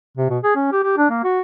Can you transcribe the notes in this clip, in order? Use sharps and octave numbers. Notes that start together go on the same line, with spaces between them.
C3
B2
G#4
C#4
G4
G4
D4
A#3
F#4